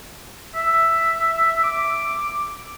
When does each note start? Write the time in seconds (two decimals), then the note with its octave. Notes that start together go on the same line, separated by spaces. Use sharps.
0.55 E5
1.64 D6